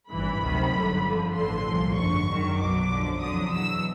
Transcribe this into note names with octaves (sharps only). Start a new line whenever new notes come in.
G#1 G2 E3 B5
D2 C3 D#3 F#3
G1 F#2 D3
F2 D3 F3
A1 G2 D3 C6
C2 A#2 F3
G#1 F#2 D3 C#6
F#2 D#3 F#3
B1 B2 F#3 D6
F#2 D3 F3
F2 D3 F#3 D#6
E2 B2 F#3 E6